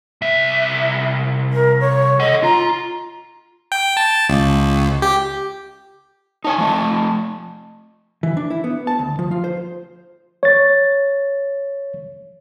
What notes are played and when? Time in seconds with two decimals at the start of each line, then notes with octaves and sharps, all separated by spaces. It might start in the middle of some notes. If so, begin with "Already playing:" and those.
0.22 C2 E5
1.53 A#4
1.80 C#5
2.20 A4 D#5 F#5
2.43 F4 A#5
3.72 G5
3.97 A5
4.29 C#2
5.02 G4
6.44 D#4 C#5 G#5 A5
6.58 F3 A3 A5
8.23 E3
8.37 D4
8.50 E4
8.64 B3
8.87 A5
8.99 D2
9.19 F3
9.31 F4
9.44 C5
10.43 C#5 A6